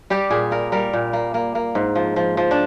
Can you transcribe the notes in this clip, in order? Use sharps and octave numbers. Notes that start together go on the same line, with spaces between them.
G3 G4
A#2 G#4
A#3 A#4
G3 A#4
A#2
A#3
A#3
A#3
G#2
F3
F3
F3
D4